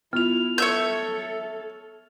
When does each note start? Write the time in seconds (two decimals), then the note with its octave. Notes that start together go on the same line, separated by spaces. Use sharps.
0.13 B3 E4 F4 F6 F7
0.58 A4 C#5 E5 G6